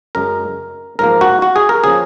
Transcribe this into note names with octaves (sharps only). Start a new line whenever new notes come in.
F#2 C#3 G#3 A#4
G#2 F3 A#3 A#4
F#4
F#4
G#4
A#4
C#3 F3 A#3 G#4